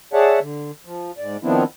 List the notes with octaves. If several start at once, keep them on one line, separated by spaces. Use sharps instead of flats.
G#4 C#5 D5 E5 F#5 A5
D3
F3
G#2 D5
D#3 F3 B3 C4 D4 E4